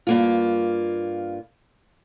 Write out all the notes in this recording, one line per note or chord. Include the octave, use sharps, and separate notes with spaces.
G2 A#3 F4